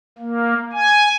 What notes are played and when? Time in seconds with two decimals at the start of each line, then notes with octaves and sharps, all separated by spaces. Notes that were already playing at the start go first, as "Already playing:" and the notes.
0.18 A#3
0.73 G#5